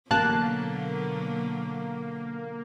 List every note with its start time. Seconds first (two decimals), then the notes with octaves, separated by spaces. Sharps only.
0.11 A1 B2 D3 F#3 A#3 A5 F#6